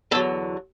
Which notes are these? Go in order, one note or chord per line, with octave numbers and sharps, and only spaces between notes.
E2 D3 F#3 A4